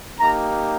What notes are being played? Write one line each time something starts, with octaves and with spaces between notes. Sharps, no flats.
A#3 D#4 G4 A#5